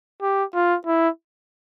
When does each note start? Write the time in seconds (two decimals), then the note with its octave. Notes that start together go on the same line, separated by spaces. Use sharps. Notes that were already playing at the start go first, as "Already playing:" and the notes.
0.22 G4
0.54 F4
0.86 E4